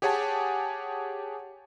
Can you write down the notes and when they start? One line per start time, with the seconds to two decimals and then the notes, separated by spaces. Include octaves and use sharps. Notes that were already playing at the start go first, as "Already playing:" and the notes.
0.02 G4 G#4 C#5 F#5 G#5 A5